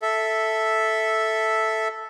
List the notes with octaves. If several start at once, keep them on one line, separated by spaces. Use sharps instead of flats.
A4 E5